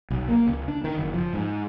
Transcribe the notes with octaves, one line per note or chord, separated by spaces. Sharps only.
B1
A#3
C#2
D4
D#3
F#1
F3
G#2